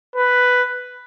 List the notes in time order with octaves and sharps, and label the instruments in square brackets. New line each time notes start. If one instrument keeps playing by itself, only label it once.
[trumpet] B4